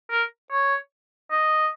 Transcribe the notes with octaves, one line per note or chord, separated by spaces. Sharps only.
A#4
C#5
D#5